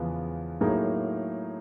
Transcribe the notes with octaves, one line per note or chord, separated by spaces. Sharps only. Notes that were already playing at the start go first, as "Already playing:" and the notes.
Already playing: E2 C#3 F3 G#3 B3
A2 F#3 A#3 D#4 G#4